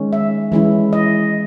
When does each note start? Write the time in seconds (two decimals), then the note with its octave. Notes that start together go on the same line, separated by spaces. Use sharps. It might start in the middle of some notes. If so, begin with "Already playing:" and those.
Already playing: D#3 G#3 C#4
0.13 E5
0.52 E3 G#3 C#4 E4
0.93 D#5